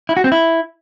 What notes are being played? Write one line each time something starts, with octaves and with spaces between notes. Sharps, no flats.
E4
F#4
C4
E4